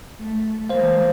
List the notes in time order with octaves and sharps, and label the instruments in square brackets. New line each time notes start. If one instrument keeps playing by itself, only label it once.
[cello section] A3
[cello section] E3 G#3 A#3 [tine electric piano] C5 F5